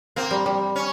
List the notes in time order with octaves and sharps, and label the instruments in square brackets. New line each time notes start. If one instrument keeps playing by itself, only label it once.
[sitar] A#3 [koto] C4
[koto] G3
G3
[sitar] C#4